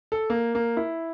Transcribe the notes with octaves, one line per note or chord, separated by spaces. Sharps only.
A4
A#3
A#3
E4